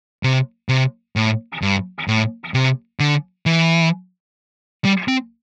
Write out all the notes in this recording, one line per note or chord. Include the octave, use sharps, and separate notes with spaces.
C3
C3
A2
G2
A2
C3
D3
E3
G3
C4